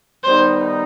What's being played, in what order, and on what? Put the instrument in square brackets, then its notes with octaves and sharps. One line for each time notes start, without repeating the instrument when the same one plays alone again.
[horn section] D#3 G3 B3 D#4 [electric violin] C5